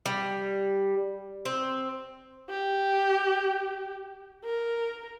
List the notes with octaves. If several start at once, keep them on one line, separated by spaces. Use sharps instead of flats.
G3
C4
G4
A#4